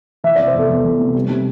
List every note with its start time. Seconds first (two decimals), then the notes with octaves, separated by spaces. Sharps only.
0.24 E3 E5
0.36 D5
0.40 C3
0.47 C5
0.54 E2 A4
0.70 E2
0.85 E3
1.00 C3
1.15 G3
1.30 C3